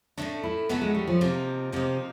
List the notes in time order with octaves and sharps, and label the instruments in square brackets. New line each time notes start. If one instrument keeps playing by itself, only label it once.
[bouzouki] A2 F#3 A3 C#4 [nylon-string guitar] D4
[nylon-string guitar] E4
[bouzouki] A2 F#3 A3 C#4 [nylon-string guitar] B3
[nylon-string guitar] G#3
G3
F3
[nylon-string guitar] C3 [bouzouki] F3 A#3 D#4
[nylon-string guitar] C3 [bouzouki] F3 A#3 D#4